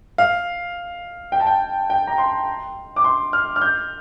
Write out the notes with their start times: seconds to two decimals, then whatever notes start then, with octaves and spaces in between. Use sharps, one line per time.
0.18 F5
1.32 G5
1.40 A5
1.47 G5
1.90 G5
2.07 A#5
2.18 C6
2.96 D6
3.04 C6
3.33 F6
3.56 F6
3.62 G6